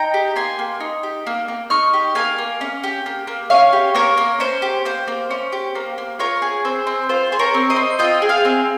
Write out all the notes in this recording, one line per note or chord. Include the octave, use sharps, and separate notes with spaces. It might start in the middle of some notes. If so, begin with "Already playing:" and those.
Already playing: D#4 G5 A#5
G4
A#3 G#5 C6
A#3
D#4
G4
A#3
A#3
D#4 C#6 F6
G4
A#3 F5 G#5
A#3
C#4
G4
A#3
A#3
C#4 C#5 F5
G4
A#3 A#4 C#5
A#3
C#4 C5
G4
A#3 C5
A#3
C#4
G4
A#3
A#3
F4 A#4 C#5
G#4
C4 C5
C4
F4 C5
G#4 C5
A#4 C#5
C4
C5 D#5
C4
F4 D#5 G5
G#4
F5 G#5
C4